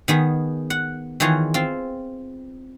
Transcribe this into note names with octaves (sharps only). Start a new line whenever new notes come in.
D#3 B3 G#4
F#5
D#3 E3 F4 G#4 C#5
C4 F4